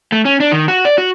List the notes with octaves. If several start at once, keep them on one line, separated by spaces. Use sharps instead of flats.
A3
C#4
D4
D#3
F#4
D5
F#4